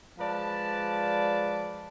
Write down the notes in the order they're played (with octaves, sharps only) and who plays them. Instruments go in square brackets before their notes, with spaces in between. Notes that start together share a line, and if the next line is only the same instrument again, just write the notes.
[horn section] F3 G#3 B4 D5 A5